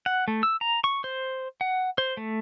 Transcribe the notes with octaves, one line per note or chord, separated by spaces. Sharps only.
F#5
A3
E6
A#5
C#6
C5
F#5
C5
A3